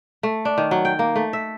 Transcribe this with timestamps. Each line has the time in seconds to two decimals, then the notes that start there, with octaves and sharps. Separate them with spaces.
0.23 A3
0.45 D4
0.58 D#3
0.71 F#3
0.85 G5
0.99 A#3
1.16 A3
1.33 E5